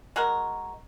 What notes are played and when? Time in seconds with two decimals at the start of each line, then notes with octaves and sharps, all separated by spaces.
0.16 G#3 F#4 A#4